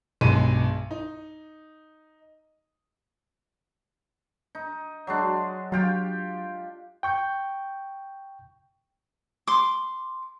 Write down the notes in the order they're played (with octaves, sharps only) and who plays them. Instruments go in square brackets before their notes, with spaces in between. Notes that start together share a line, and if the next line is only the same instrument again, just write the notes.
[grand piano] B1 G2 G#3 D#7
D#4
[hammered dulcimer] D#4
F#3 G#3 D4
[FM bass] F#3 [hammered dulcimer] F4 G4 G5
[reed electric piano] G5 C#6 G6
[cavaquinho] C6 D6